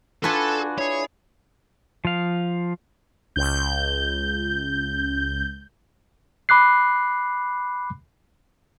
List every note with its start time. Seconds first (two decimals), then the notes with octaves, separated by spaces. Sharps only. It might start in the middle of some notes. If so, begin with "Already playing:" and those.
0.24 D4 F4 F#4 A4 B4 G#5 A5
0.78 E4 G#4 C#5
2.05 F3 F5
3.36 C#2 G6
6.49 B5 D6 F#6 C7